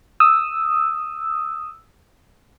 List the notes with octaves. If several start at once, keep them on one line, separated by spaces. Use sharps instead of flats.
D#6 E6